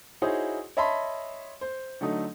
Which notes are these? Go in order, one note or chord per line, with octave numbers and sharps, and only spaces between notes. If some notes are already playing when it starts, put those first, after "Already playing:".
D#4 E4 F#4 G#4 C5 C#5
C#5 D#5 E5 A5 B5 C6
C5
D3 F#3 A3 D#4